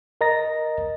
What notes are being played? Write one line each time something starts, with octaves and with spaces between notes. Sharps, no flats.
A#4 D#5 A#5 A6 A#6